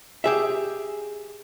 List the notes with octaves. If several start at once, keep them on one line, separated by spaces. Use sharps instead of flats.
G4 G#4 E5